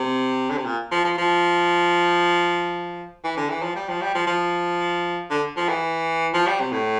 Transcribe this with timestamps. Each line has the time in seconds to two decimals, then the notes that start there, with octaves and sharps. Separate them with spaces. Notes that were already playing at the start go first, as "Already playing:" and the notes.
Already playing: C3
0.50 D3
0.57 C3
0.66 A#2
0.92 F3
1.05 F3
1.18 F3
3.24 E3
3.37 D3
3.50 E3
3.63 F3
3.76 G3
3.89 F3
4.02 G3
4.15 F3
4.27 F3
5.31 D3
5.57 F3
5.69 E3
6.34 F3
6.47 G3
6.60 C3
6.72 A2